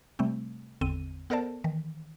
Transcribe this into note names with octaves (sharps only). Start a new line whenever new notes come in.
C3 G3 A3 C4
G#1 E2 D3 C4 D#7
B3 A4 A#4 C5 D5 A5
D#3 E3